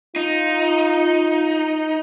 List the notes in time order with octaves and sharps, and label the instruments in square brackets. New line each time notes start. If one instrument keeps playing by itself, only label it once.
[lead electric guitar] D#4 [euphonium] F4